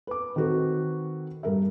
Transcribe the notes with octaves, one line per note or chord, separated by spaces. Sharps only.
B4 D6
D#3 C4 F#4 A4 B4
G2 A#4 E5